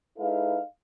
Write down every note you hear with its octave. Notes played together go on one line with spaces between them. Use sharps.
G#3 D#4 E4 A4 B4 F5